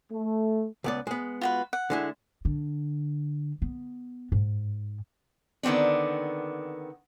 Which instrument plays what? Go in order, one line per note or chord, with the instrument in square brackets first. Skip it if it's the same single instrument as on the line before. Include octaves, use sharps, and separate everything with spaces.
[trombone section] A3
[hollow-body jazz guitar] C#2 B3 D5
G#3 B3
[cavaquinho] F4 F#4 B4
F#5
[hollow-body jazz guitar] D3 G#3 E4
[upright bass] D3
B3
G#2
[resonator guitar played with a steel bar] D3 D#3 B3 C4 D4